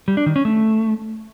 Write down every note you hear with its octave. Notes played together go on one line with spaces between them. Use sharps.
G3
D4
D#3
C#4
A3